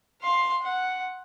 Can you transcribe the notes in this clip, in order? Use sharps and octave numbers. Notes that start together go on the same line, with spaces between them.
F5 C6
F#5